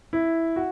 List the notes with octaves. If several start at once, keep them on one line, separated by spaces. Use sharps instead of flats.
E4
F#4